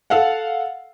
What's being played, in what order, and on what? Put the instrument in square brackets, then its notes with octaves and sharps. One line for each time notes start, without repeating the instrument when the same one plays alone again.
[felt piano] A4 F5 F#5